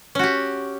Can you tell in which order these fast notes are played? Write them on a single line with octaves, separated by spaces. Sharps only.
C#4 F#4 G4